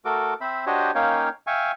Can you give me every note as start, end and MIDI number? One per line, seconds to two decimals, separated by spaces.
0.05 0.34 57
0.05 0.34 66
0.05 0.34 69
0.05 0.34 70
0.05 0.34 86
0.41 0.65 60
0.41 0.65 72
0.41 0.65 76
0.41 0.65 83
0.66 0.91 62
0.66 0.91 66
0.66 0.91 67
0.66 0.91 72
0.66 0.91 73
0.66 0.91 75
0.95 1.29 58
0.95 1.29 61
0.95 1.29 63
0.95 1.29 73
0.95 1.29 77
0.95 1.29 79
1.47 1.72 76
1.47 1.72 77
1.47 1.72 79
1.47 1.72 80
1.47 1.72 85